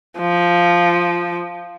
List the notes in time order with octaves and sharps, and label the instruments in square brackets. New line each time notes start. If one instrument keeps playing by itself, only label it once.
[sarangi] F3